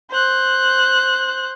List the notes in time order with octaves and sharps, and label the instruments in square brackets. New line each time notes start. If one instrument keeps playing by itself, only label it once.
[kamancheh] C5 F#6